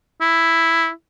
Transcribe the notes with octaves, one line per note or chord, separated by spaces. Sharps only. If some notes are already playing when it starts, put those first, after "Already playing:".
E4